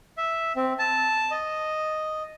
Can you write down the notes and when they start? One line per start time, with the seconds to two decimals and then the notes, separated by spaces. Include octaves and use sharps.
0.17 E5
0.56 C4
0.79 A5
1.31 D#5